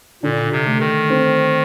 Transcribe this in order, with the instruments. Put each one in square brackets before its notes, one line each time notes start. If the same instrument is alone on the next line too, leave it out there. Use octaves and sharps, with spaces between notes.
[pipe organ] A#2 [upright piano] D3
[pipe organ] C3
[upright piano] A3
[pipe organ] D#3
[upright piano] C4